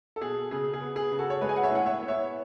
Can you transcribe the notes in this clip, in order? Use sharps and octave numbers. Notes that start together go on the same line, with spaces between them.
A4
B2 G#4
C#3 G#4
G#4
B3
G#4
C#3
F#4 A4
C#5
G#3 G#4 B4
G#5
F#5
C#5 E5
A2 F#5
C#5 E5
B3
C#5 E5